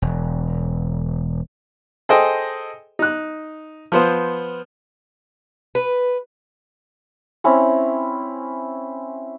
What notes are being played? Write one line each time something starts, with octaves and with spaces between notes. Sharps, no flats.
E1
G#4 A4 C5 D#5 G5
D#4 F#6
F3 B3 C5
B4
C4 C#4 E4